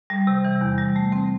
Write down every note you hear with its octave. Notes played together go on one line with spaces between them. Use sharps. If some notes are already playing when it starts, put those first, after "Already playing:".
G3
C3
E3
E2
G3
A3
C4